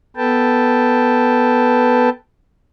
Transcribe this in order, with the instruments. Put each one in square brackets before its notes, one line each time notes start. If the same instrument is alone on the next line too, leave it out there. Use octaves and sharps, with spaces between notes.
[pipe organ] B3 A4 B4 G5 A5